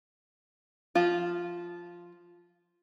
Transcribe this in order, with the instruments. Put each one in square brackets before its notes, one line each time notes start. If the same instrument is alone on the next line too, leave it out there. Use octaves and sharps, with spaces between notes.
[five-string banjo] F3 F4